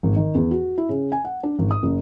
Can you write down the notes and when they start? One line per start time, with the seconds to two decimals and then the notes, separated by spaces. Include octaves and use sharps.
0.03 G#1
0.16 D#3
0.35 E2
0.51 F#4
0.78 E4
0.89 C#3
1.12 G#5
1.25 F#5
1.43 D4
1.59 G#1
1.71 D#6
1.83 F#1